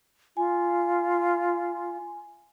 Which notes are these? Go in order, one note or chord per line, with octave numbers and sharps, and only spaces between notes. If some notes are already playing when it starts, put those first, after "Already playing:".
F4 G#5